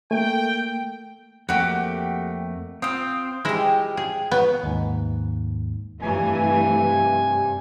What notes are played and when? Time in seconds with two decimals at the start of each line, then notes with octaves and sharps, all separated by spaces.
0.11 A3 A#3 G5
1.49 F2 A3 A#3 F#4 G4
2.82 C4 F4 C5 D#6
3.45 F3 G#3 E4 G4
3.97 G#4
4.31 B3 F4 C#5
4.63 D#2 G#2
6.03 G2 C3 E3 A3 G#5